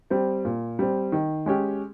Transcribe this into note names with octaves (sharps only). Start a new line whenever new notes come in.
G3 C4
A#2
G3 C4
D#3
G#3 C#4 G4